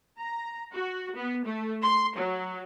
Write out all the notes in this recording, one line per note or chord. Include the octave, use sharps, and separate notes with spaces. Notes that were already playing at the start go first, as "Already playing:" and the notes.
A#5
F#4
B3
A3
C6
F#3